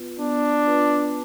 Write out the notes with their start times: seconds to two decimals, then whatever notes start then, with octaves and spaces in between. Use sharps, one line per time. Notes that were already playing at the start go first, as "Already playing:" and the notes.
Already playing: B3 F4 B4
0.19 B3 D4
0.66 F4 B4